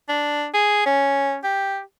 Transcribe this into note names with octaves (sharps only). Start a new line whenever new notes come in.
D4
G#4
C#4
G4